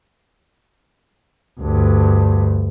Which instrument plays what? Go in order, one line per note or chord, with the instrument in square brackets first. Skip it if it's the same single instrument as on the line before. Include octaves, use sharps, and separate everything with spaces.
[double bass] D2 G2